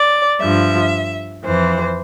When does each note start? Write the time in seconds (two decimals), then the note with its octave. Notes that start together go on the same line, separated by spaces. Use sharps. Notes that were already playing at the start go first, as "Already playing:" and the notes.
Already playing: D5
0.40 G2 F3 E5
1.45 F2 E3 C5